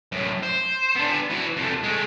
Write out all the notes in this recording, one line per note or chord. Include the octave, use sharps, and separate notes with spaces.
F#2 A2
C5
B3 D4
E3 F#4
F2 A3
G#3 A3